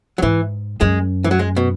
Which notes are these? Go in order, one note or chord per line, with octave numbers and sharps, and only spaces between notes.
F#3
G#2 E3
F#2 G#3
E3
F#3
G#3
B2